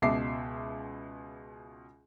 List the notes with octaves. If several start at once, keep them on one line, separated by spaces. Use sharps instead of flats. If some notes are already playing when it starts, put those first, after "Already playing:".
C#2 B2 E5 A5 D6 C7